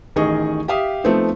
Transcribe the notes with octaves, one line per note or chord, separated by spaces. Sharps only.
A1 D#3 G#4 D#5 C#6
G4 E5 F5 D#6
F3 A3 B3 C4 D#4